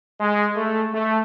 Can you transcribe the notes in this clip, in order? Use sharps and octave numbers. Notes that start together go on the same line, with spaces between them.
G#3
A3
A3